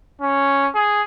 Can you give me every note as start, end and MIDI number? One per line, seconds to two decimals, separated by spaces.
0.21 0.68 61
0.75 1.02 68